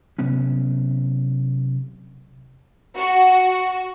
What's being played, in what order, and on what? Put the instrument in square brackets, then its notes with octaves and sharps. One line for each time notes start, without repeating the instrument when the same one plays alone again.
[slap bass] C3 F#3 B3 C#4
[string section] F#4